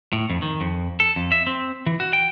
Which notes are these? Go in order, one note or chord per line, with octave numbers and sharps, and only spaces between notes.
A2
F2
D#3
F2
A4
F2
E5
C4
E3
F#4
G5